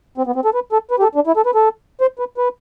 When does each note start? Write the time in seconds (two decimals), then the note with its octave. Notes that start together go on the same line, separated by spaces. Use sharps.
0.18 C4
0.27 B3
0.36 C4
0.45 A4
0.54 B4
0.72 A4
0.91 B4
0.99 G4
1.03 A4
1.15 D4
1.27 E4
1.37 A4
1.46 B4
1.55 A4
2.01 C5
2.19 B4
2.37 B4